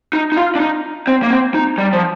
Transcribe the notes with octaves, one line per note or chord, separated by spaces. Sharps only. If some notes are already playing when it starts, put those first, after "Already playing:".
D#4
D#4
F4
D4
D#4
C4
A#3
C4
D#4
G3
F3